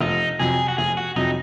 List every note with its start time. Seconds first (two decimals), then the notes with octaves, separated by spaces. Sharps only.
0.01 F1 D#4
0.39 F2 C3 F#3 G#4
0.68 F#4
0.78 F1 G#4
0.97 F#4
1.16 F2 C3 F#3 D#4